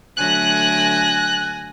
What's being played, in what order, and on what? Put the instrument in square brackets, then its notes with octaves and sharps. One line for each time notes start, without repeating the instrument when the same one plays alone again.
[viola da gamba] D3 F#3 A3 [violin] G#5 A#6 [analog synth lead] F#6